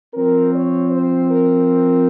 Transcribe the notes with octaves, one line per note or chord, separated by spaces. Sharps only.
F3 C4 A#4
C#5
C5
A#4